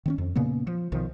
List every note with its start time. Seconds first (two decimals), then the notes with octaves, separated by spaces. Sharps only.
0.06 D#3 C4 C#4
0.18 F2
0.35 A#2 C#3 A#3 B3
0.67 F3
0.92 B1 D#3 F3